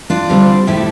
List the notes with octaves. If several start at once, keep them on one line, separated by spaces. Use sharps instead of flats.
D4 F4
D2 D3 G3 C4
A2 F3 A3 E4 G4